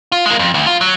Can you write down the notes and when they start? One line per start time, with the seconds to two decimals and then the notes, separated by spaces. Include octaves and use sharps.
0.12 F4
0.26 G#3 A#3
0.39 F2
0.54 D2
0.67 F4
0.81 F#3